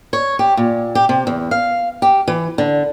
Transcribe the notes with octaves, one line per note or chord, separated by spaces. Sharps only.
C#5
G4
A#2
G4
C3
E2
F5
G4
E3
D3